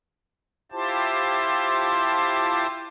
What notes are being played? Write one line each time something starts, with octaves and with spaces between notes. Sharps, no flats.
E4 F4 G4 C5 A5